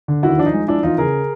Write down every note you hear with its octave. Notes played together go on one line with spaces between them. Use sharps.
D3
D#2 E4 F#4
F3 D4
D#4
G#3
F3 D4 E4
E2 D#4 F4
C#3 G#4 A#4